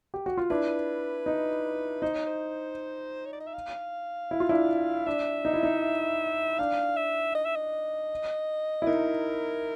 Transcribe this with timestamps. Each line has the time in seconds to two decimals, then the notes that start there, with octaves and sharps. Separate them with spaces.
0.14 G4
0.26 F#4
0.38 F4
0.50 D4 E4 B4
1.26 D#4
2.02 D#4 C5
2.14 C#5
2.27 C5
3.26 C#5
3.33 D5
3.40 D#5
3.47 E5
3.54 F5
4.31 E4
4.40 F4
4.49 D4 E4
5.06 D4 E5
5.45 D#4
5.53 E4
5.63 D#4
6.59 D4 F5
6.96 E5
7.35 D#5
7.45 E5
7.56 D#5
8.82 E4
8.87 D#4 A#4